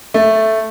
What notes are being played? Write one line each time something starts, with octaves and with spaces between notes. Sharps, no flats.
A3